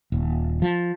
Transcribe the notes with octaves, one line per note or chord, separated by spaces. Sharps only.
D#1
F3